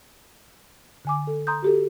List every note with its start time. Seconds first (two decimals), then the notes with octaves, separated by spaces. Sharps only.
1.05 D3 G#5 D6
1.27 A4
1.47 A#5 C6 D#6 G6
1.62 F#4 G4 A4